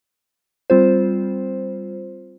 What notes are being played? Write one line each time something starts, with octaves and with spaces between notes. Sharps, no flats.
G3 C4 F4 C5